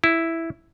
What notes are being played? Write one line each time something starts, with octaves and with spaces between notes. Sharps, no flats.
E4